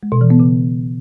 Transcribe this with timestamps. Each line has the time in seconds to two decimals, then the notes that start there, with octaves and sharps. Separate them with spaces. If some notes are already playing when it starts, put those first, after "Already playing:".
0.03 G#3
0.12 B2
0.21 E3
0.30 B3
0.40 C#3